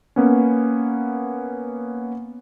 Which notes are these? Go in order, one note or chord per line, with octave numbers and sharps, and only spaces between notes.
A#3 B3 C#4